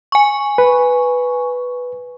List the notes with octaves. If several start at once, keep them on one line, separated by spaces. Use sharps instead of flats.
G#5 C#6
B4